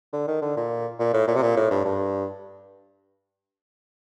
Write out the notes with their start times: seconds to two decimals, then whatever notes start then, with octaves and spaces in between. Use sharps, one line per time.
0.13 D3
0.28 D#3
0.42 D3
0.56 A#2
0.99 A#2
1.14 A2
1.28 A#2
1.36 C3
1.42 A#2
1.56 A2
1.71 G2
1.85 G2